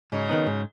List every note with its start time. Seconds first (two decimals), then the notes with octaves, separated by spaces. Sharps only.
0.12 G#2 C#3 F#3
0.29 D#3 B3 D#4
0.47 G#2